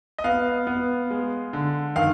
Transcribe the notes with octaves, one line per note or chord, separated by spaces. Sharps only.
D#5
B3 F5
B3
G#3
D3
D#3 F5